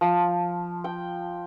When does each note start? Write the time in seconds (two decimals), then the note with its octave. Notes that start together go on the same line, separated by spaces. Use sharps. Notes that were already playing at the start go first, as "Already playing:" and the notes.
0.01 F3
0.84 G5